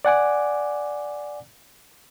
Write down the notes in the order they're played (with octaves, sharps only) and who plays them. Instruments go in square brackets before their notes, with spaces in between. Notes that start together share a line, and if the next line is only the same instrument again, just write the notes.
[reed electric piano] D5 F#5 G#5 D6